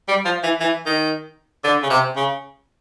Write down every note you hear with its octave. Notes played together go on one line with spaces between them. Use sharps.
G3
F3
E3
E3
D#3
D3
C#3
C3
C#3